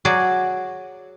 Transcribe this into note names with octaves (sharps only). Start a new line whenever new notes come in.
F#3 F#4 G#4 D5